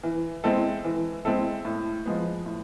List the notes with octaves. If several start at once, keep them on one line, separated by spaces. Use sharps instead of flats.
E3
G#3 C4 E4 A4
E3
G#3 C4 E4 A4
A2
F3 G#3 B3
A2